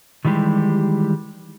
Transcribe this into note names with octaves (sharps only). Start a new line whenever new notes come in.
D#3 E3 G3 G#3 G4